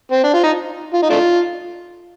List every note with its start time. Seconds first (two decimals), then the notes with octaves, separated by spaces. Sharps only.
0.12 C4
0.24 D4
0.34 F4
0.44 D#4
0.94 F4
1.02 D#4
1.10 A3 D4 F4